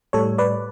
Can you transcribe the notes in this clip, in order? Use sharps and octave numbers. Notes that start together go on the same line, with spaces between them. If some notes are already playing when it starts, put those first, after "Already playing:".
A2 G3 A4 C#5
B4 D5